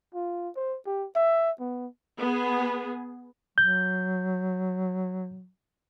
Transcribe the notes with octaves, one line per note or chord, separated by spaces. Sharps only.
F4
C5
G4
E5
B3
B3 G#4
F#3 G6